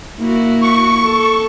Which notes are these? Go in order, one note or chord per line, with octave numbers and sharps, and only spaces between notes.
A#3 E4 F#4
C#6
A4